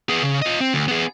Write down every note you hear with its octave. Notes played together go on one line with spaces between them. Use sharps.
B3 G#4
C#3
F4 D#5
C4
D2
B3 G#4